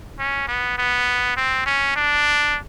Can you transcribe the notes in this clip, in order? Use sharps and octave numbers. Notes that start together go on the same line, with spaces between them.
C#4
B3
B3
C4
C#4
D4